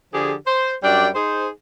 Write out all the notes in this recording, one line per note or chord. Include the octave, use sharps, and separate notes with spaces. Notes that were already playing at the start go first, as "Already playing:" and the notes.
D3 F3 G4 G#4
C5
F#2 G3 D4 D5 G5
D#4 G#4 C5